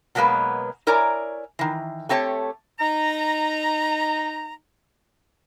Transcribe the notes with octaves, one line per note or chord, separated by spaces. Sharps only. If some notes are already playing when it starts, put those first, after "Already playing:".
B2 F#3 G#3 A#3 B3 B4
E4 A#4 C#5 D5 G#5 A#5
D#3 E3
A3 C4 G4 C#5 A5
D#4 A#5